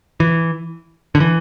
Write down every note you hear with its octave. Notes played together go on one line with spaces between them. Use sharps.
E3
D3
E3